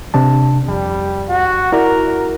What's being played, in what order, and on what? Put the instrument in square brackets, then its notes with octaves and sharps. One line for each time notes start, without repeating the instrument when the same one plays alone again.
[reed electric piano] C3 D4 A5
[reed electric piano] F2 [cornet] G3
[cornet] F#4
[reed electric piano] E4 F#4 D5 [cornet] A#4